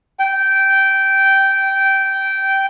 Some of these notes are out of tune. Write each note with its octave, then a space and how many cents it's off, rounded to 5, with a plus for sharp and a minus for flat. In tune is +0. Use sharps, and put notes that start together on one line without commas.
G5 -15